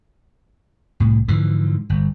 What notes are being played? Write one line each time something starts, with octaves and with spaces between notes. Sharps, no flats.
C2 A2
G#2 D3 E3 F3
G1